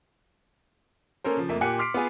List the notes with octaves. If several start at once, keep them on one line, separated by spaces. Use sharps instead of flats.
A#3 C#4 A4 A#4 C5
C#3 F3
F2 A3 A#3
A#2 A#3 G4 G#5 F#6 C#7
C6 D6 F6 B6 C7 D7
B3 F4 G#4